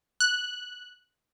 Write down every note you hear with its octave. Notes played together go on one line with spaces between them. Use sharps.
F#6